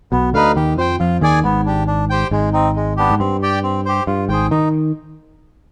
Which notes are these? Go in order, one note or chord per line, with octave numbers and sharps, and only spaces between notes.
B1 B2 B3
D2 D3 D#4 B4 F5
D#2 D#3 G4
F2 F3 C5 G5
F2 F3 F4
D#2 D#3 G#4 D5 G#5
G#1 G#2 B3
D4 G4
D4
G4 C5 G5
G#1 G#2 G#3
C4 D#4
G#3
B3 D4 G4
G#2
G2 C4
G4 D5 G5
C4
G4 C5
G2 F4
G#1 G#2 G#4 C5 G5
D#3 D#4